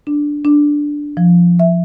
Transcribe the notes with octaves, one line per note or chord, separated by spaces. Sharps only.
D4
D4
F3
E5